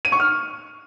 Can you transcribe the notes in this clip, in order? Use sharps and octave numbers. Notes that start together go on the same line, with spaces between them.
D#7
C#6
F6